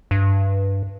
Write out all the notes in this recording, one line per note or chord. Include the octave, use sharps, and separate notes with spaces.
G2